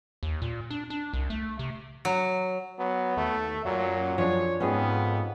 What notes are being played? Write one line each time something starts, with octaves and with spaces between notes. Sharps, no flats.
D#2
A#2
D4
D4
C2
A3
C3
F#3
F#3 B3
D#2 A3
F#2 A#2 F#3
F#2 F3 D4 G#4 C#5
F2 G#2 B3 C#4 G4 G#4